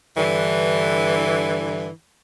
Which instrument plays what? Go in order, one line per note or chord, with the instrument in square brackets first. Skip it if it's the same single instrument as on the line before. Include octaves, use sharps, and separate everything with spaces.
[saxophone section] G2 D3 E3